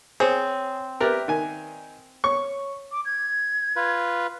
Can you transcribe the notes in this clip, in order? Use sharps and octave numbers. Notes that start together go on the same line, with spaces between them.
C4 G#4 C#5
G4 A#4 B4 D5 E5
D#3 G#5
C#5 C#6
D6
G#6
F4 B4